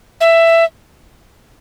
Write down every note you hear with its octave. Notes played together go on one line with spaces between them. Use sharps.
E5